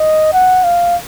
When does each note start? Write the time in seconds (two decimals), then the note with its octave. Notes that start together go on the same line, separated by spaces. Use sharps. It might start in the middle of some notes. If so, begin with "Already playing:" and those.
Already playing: D#5
0.34 F#5
0.64 F5